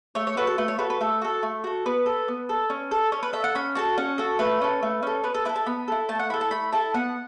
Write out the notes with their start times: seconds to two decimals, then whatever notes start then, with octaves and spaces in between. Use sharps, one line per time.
0.15 A3 C#5
0.27 C#5
0.37 F#4 A4 B4
0.47 A4
0.58 A3 B4
0.68 C#5
0.79 F#4 A4 B4
0.90 B4
1.01 A3 A4
1.22 F#4 A4
1.43 A3
1.64 F#4 A4
1.86 B3 B4
2.06 A4
2.28 B3
2.49 A4
2.70 C#4
2.91 A4
3.12 C#4 C#5
3.23 B4
3.33 A4 E5
3.44 F#5
3.55 C#4 B5
3.75 F#4 A4 A5
3.98 C#4 F#5
4.18 F#4 A4
4.39 A3 B4
4.61 C#4 A4
4.83 A3
5.03 C#4 A4
5.24 B3 B4
5.34 A4
5.45 E4 B4
5.49 A4
5.56 A5
5.66 B3 B5
5.88 E4 A4
6.09 A3 A5
6.19 F#5
6.30 E4 A4 B5
6.41 A5
6.51 A3 B5
6.72 E4 A4 A5
6.94 B3 F#5